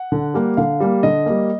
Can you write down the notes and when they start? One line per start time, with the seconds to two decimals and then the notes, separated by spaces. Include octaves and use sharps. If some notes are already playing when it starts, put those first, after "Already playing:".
Already playing: F#5
0.12 D3
0.34 G3 A#3
0.57 D3 F5
0.80 G3 A#3
1.03 D3 D#5
1.26 G3 A#3